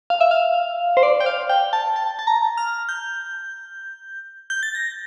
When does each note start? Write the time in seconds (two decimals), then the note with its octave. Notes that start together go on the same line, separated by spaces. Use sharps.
0.10 F5
0.21 E5
0.31 F5
0.97 C5
1.03 D5
1.20 G5
1.26 F5
1.49 G5
1.73 A5
1.96 A5
2.19 A5
2.27 A#5
2.57 F6
2.89 G6
4.50 G6
4.63 A6
4.75 A#6